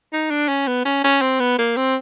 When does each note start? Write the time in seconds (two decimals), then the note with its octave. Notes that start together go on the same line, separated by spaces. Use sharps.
0.13 D#4
0.30 D4
0.48 C#4
0.67 B3
0.85 C#4
1.04 C#4
1.21 C4
1.40 B3
1.58 A#3
1.76 C4